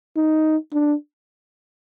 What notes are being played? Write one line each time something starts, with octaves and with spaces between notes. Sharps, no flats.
D#4
D4